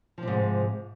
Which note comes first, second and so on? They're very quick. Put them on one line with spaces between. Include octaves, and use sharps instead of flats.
F3 C3 G#2